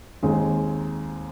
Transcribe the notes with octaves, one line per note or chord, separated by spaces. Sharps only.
D#2 D#3 G#3 C4 G#4